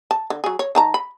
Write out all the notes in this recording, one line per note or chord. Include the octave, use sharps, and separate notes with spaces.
A5
D3
F#3 G#4
C#5
D#3 A5 A#5
B5